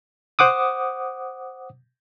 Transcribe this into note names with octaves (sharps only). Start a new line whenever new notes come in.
C5 F#5 D6 D#6